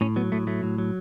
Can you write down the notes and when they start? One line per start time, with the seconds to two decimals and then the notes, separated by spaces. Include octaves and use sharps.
0.01 A2 C#4
0.16 F#3 B3
0.32 A2 A3
0.47 F#3 A3
0.63 A2
0.78 F#3